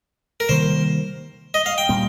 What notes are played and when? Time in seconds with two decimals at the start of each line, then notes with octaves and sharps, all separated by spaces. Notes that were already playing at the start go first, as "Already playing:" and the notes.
0.40 A#4
0.49 C3 D#3 G3 A#3 C5
1.54 D#5
1.66 F5
1.78 G5
1.89 A#2 G3 A#3